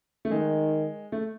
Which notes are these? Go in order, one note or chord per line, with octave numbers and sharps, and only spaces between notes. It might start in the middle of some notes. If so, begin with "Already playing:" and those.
A3
D#3 G#3
A3